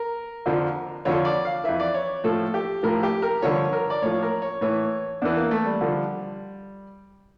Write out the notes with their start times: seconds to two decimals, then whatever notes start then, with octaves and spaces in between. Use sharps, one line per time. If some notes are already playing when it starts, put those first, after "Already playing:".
Already playing: A#4
0.46 F2 D3 F3
1.05 F2 D3 F3 C#5
1.25 D5
1.45 F5
1.64 F2 E3 E5
1.80 D5
1.94 C#5
2.24 A2 F3 A4
2.54 G4
2.83 A2 F3 A#4
3.03 G4
3.22 A#4
3.42 G2 D3 F3 C#5
3.73 A#4
3.90 D5
4.02 A2 F3 C#5
4.23 A#4
4.42 C#5
4.61 A2 E3 C#5
5.22 E2 E3 D4
5.36 A#3
5.51 A3
5.66 G3
5.81 D3 F3